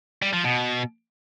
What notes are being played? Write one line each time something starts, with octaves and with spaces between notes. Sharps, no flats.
G3
F3
B2